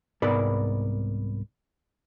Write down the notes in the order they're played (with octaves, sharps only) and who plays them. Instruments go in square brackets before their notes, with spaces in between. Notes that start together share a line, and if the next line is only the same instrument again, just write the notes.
[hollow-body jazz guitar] C2 G#2 B3 A#4 D5 B5